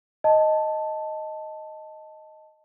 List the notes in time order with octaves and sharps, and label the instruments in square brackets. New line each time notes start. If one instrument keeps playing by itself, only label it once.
[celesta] D#5 A5